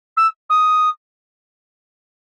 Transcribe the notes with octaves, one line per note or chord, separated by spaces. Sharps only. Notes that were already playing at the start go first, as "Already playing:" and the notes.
E6
D#6